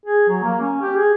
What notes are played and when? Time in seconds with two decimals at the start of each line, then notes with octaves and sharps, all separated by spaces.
0.05 G#4
0.29 F#3
0.43 A#3
0.61 C#4
0.82 G4
0.96 G#4